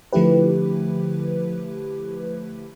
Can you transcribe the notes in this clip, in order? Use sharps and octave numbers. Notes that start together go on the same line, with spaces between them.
D3 F3 A3 E4 G4 B4